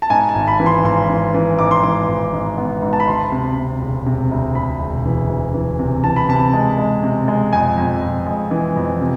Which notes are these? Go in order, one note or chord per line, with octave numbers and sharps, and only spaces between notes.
A5
G#2 G#5
A5
G#1
B5
E3
C6
G#1 C6
E3
E3
G#2 D6
C6
E3 D6
G#1
G#2
B3
G#2
A5
B5
D2 C6
C3
C3
E1
C3
D2
E1 B5
E1
E3
D2
E3
C3
E3 A5
B5
C3 A5
G#3
G#3
C3
G#3
F2 G#5
F2
F2
G#3
E3
F2
C3